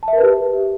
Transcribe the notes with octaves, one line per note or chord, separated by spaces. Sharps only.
A5
E5
A#4
B4
G4